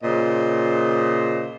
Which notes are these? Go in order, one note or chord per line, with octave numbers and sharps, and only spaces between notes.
A#2 C#3 C5 D#5